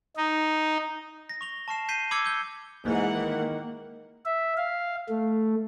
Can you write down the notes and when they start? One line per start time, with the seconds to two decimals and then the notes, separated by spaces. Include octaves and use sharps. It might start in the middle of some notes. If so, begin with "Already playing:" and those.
0.16 D#4
1.29 A#6
1.41 C#6 F7 G7
1.68 A5 C#6 F6 C7 E7
1.89 G6 B6 C7 D#7 G7
2.11 B5 D6 E6 G#6 C#7 G7
2.25 D6 G6 G7
2.85 G#2 E3 G#3 A#3 F#5
3.13 D#3
4.25 E5
4.57 F5
5.09 A3